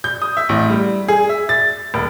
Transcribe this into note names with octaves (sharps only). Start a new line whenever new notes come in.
G6
D#6
E5
A1
G3
G#4
E5
A6
D#1